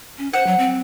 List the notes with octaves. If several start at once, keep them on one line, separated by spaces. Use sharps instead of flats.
C#4
C5 F#5
F#3
C4